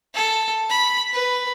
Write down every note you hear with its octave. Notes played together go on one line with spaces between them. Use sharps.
A4
B5
B4